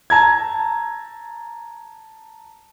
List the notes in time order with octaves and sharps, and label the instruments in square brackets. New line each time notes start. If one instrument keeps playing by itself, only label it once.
[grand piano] A5 A#5 G#6